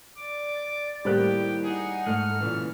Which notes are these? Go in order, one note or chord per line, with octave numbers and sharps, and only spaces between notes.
D5 D6
A2 D#3 G3 A#3 G4 C5 F#6
D#4 G#4 F#5
G#2 A3 F6
A#2 C#3 E3